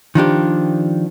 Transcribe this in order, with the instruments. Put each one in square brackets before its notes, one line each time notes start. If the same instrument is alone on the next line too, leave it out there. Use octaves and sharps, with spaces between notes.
[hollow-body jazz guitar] D#3 F3 D4 G4